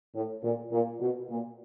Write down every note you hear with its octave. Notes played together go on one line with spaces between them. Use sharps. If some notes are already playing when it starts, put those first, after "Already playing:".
A2
A#2
A#2
B2
A#2